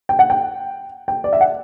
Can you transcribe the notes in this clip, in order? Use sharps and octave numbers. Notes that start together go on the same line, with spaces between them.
G5
F#5
G5
G5
D5
E5
F#5